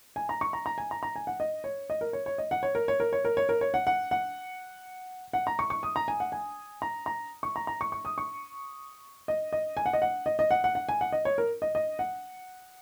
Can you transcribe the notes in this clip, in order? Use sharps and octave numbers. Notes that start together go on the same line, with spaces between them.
G#5
A#5
C#6
A#5
A#5
G#5
A#5
A#5
G#5
F#5
D#5
C#5
D#5
A#4
C#5
C#5
D#5
F#5
C#5
A#4
C#5
A#4
C#5
A#4
C#5
A#4
C#5
F#5
F#5
F#5
F#5
A#5
C#6
C#6
D#6
A#5
G#5
F#5
G#5
A#5
A#5
C#6
A#5
A#5
C#6
C#6
D#6
C#6
D#5
D#5
G#5
F#5
D#5
F#5
D#5
D#5
F#5
F#5
F#5
G#5
F#5
D#5
C#5
A#4
D#5
D#5
F#5